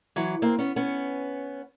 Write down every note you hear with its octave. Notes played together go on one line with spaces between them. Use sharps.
E3 F#3
A#3 C4
B3 C#4
B3 C#4